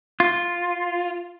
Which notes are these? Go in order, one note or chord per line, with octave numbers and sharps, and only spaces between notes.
F4